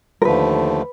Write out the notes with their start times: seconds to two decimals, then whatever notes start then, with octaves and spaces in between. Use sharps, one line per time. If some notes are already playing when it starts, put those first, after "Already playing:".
0.22 A#4
0.25 D#2 D3 F3 A3 B4